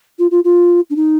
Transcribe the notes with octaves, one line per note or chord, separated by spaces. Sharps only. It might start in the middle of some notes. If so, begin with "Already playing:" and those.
F4
F4
F4
D4
D#4